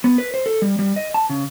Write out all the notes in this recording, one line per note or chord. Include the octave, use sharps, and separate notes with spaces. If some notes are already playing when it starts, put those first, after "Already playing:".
B3
B4
C5
A4
G3
G3
D#5
A5
C#3